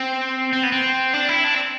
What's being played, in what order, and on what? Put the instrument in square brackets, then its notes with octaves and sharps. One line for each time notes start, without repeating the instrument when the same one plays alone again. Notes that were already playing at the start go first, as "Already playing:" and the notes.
Already playing: [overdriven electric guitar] C4
C4
B3
C4
D4
E4
D4
C4